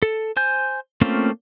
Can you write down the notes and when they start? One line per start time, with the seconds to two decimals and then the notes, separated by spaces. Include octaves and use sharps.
0.02 A4
0.37 C5 G#5 G6
1.01 A3 A#3 C4 C#4 F4